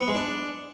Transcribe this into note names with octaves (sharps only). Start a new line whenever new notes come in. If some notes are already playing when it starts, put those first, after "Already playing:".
B3
G#3
D4